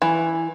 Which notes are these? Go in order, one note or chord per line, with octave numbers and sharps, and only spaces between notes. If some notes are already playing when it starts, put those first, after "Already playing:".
E3